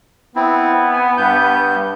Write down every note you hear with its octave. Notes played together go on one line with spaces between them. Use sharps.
B3 C4 E4
G#5
G2 G6